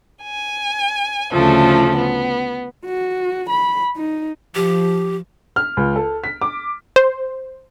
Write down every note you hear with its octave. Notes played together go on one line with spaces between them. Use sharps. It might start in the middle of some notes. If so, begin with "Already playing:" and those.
G#5
D2 C#3 F3 A3 A4
B3
F#4
B5
D#4
F3 G4
F6
C#2
A4
B6
D6
C5